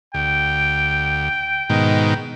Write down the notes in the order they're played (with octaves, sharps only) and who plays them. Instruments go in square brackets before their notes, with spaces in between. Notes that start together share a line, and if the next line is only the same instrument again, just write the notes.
[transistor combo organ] D2 [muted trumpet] G5
[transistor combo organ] G#2 B2 D#3